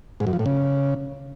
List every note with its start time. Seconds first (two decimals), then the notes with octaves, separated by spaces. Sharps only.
0.20 G#2
0.27 F#2
0.33 F3
0.39 A2
0.46 C#3